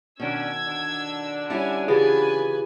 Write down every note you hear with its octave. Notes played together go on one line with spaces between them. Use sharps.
B2 D#3 C#4 D4 E6 G#6
D3 D4
G3 C#4 E4 G#5
C#3 E3 F4 G4 G#4 B4 G#5